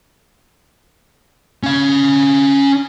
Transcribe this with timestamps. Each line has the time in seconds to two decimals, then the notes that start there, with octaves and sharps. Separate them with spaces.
1.63 C#4 F5